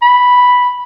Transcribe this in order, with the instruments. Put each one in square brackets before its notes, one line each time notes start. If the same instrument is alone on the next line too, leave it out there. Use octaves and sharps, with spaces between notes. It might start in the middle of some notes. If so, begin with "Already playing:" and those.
[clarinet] B5